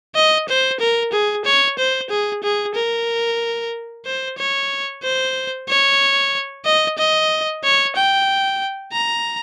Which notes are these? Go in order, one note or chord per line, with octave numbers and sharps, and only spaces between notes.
D#5
C5
A#4
G#4
C#5
C5
G#4
G#4
A#4
C5
C#5
C5
C#5
D#5
D#5
C#5
G5
A#5